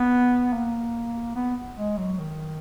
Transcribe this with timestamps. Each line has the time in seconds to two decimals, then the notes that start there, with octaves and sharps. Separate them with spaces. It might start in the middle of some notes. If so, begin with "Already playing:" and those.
Already playing: B3
0.53 A#3
1.35 B3
1.77 G#3
1.98 F#3
2.19 D#3